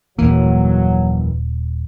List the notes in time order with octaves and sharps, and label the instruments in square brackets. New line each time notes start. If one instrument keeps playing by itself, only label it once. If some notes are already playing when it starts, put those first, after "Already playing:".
[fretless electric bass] D#1 [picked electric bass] F#2 A#3 [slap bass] E3 [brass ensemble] F#3